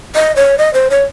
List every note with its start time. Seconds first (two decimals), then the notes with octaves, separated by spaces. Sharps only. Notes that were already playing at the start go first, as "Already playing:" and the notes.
0.15 D#5
0.36 C#5
0.58 D#5
0.74 C5
0.90 C#5